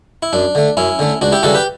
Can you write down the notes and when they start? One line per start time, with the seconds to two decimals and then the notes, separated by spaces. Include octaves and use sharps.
0.23 E4
0.33 F#2 D4
0.55 D3 A3
0.77 F#2 C#4 E4
0.99 D3 A3
1.21 C#2 D4 F#4
1.32 E4 G4
1.43 C#3 E3 G3 F#4 A4
1.55 G4 B4